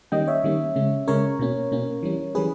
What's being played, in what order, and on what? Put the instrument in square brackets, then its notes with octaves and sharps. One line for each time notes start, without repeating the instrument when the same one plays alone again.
[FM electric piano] D#3 G3 A#3 C#4 D#5 G5
C#5 E5
D#3 G3 A#3 C#4
C#3 G#3 C#4
C#3 G#3 C#4 A#4 C#5
B2 A#3 C#4
B2 A#3 C#4
E3 G3 C#4
E3 G3 C#4 G#4 B4